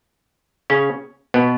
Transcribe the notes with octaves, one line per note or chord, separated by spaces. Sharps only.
C#3 C#4
B2 B3